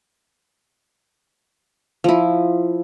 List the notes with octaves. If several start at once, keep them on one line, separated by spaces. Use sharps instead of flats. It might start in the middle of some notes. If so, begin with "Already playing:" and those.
F3 E4